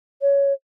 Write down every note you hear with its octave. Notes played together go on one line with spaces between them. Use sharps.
C#5